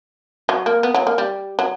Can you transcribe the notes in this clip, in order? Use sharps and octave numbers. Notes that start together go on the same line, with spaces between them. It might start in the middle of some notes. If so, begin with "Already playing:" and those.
F#3
A#3
B3
F#3
A#3
G3
F#3